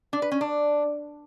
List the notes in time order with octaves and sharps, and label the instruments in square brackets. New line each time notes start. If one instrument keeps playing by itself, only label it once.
[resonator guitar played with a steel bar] D4
B4
C#4
D4